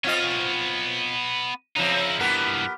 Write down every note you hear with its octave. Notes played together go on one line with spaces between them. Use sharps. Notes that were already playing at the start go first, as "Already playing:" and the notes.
B3 C4 F4 C#5 D#5
C#3 F3 C4 D#4 E4
G2 E3 B3 G4 A#4